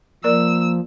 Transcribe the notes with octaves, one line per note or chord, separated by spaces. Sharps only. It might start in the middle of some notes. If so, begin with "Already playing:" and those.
F3 A#3 A#4 D5 E6